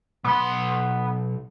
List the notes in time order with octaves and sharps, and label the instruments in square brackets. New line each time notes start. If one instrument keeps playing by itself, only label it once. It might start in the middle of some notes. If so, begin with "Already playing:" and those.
[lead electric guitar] B1 C6 [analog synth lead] B3